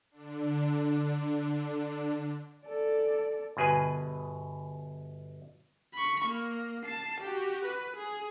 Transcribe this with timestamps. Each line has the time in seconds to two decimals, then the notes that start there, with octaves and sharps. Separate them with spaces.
0.11 D3 D4
2.66 A4 D5
3.57 G1 B2 G#4 B4 G#5
5.94 B5 C#6
6.25 A#3
6.84 A5 C7
7.21 F#4 G4
7.66 B4
7.97 G#4